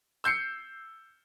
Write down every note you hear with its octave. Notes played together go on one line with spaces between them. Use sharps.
E6 G6 C7 C#7